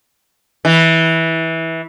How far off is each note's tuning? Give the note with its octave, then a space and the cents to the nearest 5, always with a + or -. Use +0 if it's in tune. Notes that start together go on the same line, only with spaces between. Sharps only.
E3 -15